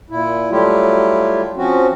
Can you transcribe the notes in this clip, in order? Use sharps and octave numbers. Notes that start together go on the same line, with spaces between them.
A#2 E4
F#3 G3 A3 E4 F4 G4
F3 C4 C#4 F#4